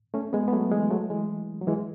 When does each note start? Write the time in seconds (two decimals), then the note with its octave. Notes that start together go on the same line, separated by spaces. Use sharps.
0.14 A3 C#4
0.33 G#3 B3
0.48 B3
0.53 F#3 A3
0.71 E3 G#3
0.91 F#3 A3
1.10 E3 G#3
1.61 F#3
1.67 E3 G#3